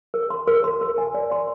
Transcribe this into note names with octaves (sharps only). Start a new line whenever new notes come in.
A#4
C6
A#4
C6
A#4
G#5
D5
C6